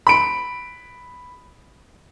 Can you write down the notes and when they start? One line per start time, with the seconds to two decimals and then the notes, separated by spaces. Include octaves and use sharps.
0.07 B5 D7